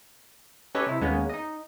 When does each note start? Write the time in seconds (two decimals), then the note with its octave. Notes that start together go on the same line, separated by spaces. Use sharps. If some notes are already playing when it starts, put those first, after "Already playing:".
0.75 C#4 G4 A4 B4 C#5 D#5
0.87 C3 E4
1.01 D#2 G#3 A#3 B3 C#4
1.29 D#4 D#5